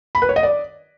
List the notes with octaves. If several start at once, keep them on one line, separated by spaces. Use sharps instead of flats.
B5
B4
C#5
D#5
D5